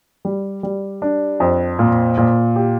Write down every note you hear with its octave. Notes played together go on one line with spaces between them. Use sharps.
G3
G3
D4
F2
A#2
A#2
G4